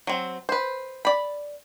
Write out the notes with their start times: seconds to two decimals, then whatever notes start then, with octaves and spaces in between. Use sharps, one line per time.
0.07 F#3 C4
0.49 B4 C5
1.05 D5 B5